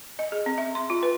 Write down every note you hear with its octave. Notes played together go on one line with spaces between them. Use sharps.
D#5
G#4
C4
E5
C6
F4
B4